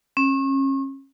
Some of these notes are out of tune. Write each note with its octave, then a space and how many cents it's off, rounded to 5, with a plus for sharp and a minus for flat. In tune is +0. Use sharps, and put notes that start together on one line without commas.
C#4 -35